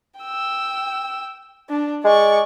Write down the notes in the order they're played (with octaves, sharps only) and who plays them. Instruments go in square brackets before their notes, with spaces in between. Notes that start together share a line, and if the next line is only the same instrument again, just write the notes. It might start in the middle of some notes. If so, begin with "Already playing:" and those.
[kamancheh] G5 E6
D4
[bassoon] G#3 [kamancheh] D5 C#6